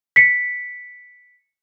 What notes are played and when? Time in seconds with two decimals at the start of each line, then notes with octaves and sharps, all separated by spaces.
0.16 B6 C#7